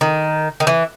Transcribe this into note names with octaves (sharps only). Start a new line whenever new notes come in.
D#3
D#3
E3